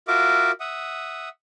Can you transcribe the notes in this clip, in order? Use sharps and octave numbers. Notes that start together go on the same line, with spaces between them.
F4 F#4 A#4 E5 D6
E5 F#5 D#6